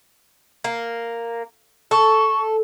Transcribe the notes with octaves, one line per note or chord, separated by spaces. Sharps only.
A#3
A4 C#6